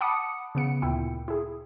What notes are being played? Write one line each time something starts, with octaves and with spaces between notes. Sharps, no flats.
F#5 A5 B5 D6 D#6 C#7
C#3 B3 C#7
D2 A#2 E4 G5
E4 G#4